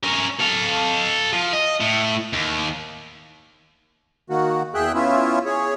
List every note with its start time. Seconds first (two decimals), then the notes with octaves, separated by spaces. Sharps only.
0.03 C#4 A#4
0.39 A4 F5
1.33 F3
1.53 D#5
1.80 A2
2.33 D#2
4.30 D#3 A#3 F#4
4.75 E2 G#4 E5 G5 F#6
4.94 B3 C#4 E4 F4 E5
5.45 G#4 C#5